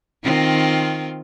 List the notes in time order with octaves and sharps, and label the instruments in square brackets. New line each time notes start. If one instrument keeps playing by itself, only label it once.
[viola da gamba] D#3 C4 F4